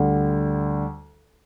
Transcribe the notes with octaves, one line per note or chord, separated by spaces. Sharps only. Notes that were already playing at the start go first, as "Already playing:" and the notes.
Already playing: D2 D3 G3